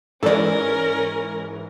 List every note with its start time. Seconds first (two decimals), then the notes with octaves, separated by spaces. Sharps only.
0.23 G#2 E3 C#4 A4 A#4 D5